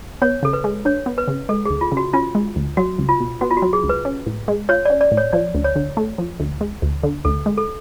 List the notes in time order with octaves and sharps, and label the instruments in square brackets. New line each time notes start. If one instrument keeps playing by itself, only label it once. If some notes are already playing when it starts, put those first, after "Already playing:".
[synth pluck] B3 [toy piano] C#5
[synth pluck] C#3 [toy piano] A4
[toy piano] B4
[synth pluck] G#3
[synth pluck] D4 [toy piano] C#5
[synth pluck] B3
[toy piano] B4
[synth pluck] C#3
[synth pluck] G#3 [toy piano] A4
[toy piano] G#4
[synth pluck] D2
[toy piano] F4
[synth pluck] C#3
[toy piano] F#4
[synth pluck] C#4 [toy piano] F4
[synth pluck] G#3
D2
[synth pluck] F#3 [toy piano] F#4
[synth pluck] C#2
[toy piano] F4
[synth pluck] B2
[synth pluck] B3 [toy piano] F#4
[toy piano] F4
F#4
[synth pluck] F#3
[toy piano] G#4
[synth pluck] C#2
[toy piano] B4
[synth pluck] C#4
A2
G#3
[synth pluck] F4 [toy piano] C#5
[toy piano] D5
[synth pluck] C#4
[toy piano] D5
[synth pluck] A2
[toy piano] C#5
[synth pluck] F3 [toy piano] D5
[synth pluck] D2
[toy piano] C#5
[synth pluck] D3
A3
F3
D2
G#3
D2
D3
[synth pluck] D2 [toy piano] A4
[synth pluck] G#3
[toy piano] A4